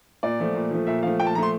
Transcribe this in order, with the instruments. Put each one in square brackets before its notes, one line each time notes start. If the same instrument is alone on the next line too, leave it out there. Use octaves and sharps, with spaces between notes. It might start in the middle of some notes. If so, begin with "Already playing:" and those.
[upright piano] A#2 [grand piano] D5
[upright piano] F3 A3
A#2
F3 A3
[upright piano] A#2 [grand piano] E5
[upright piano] F3 A3 [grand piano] F5
[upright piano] A#2 [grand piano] G5
[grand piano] A5
[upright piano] F3 [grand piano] A#5
[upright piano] A3 [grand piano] C6